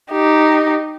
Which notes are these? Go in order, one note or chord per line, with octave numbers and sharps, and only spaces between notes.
D#4 G4